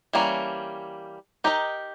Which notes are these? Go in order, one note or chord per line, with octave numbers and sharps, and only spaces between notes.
E3 G3 A#3 C#4
D#4 G4 A#4 D#5